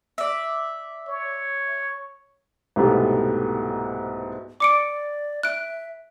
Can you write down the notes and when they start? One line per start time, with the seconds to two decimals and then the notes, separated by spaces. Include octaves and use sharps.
0.18 D5 E5
1.08 C#5
2.76 C2 G#2 B2 A3 B3 G4
4.60 D5 D6 C#7 D7
5.43 E5 F#6 D7